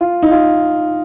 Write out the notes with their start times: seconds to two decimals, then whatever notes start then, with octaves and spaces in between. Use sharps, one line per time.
0.01 F4
0.23 D#4
0.31 F4